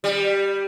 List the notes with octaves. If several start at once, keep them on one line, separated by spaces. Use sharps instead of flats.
G3